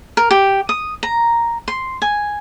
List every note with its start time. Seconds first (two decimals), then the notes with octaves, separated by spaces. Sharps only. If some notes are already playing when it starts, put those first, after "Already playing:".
0.17 A#4
0.31 G4
0.69 D#6
1.03 A#5
1.68 C6
2.02 G#5